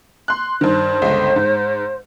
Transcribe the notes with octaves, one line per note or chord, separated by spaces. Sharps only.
C6 F#6
G2 D#3 C5
G1 C#2
G#2